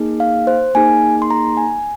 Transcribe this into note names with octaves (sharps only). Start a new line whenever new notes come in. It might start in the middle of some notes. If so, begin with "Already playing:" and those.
Already playing: A#3 D#4 G#4
F5
C5
A#3 D#4 G#4 G#5
C6
A#5
G#5